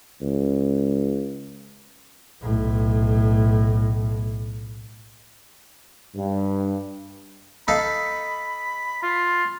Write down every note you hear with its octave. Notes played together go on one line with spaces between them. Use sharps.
C#2
B1 A2
G2
D#4 A4 F5 B5
F4